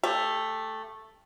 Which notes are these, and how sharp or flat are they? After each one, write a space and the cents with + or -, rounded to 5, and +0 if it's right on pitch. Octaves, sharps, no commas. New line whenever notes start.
A3 +0 G4 +25